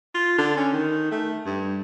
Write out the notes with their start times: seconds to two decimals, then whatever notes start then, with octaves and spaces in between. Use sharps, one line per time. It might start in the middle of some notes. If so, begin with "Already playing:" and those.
0.14 F4
0.38 D3
0.57 C#4
0.73 D#3
1.11 A3
1.46 G2